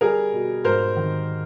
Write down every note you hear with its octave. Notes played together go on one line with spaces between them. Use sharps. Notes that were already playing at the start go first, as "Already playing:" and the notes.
G3 G#4 A#4
B2
G#2 A#4 C5
D#3